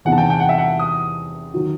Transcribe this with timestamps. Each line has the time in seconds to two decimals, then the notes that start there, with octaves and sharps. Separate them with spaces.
0.05 E2 C3 E3 B3 D#4 F#5
0.12 A5
0.18 G5
0.30 G5
0.40 F#5
0.49 E5
0.58 F#5
0.79 D#6
1.54 D#3 F#3